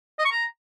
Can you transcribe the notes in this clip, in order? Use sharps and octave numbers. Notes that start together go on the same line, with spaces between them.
D#5
C#6
A#5